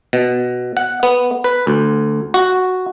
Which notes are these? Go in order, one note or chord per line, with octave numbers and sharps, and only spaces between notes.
B2
F#5
B3
B4
D2
F#4